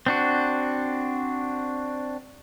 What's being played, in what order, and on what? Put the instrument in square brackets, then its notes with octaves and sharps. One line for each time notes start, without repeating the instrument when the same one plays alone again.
[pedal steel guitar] C4 D4 F#4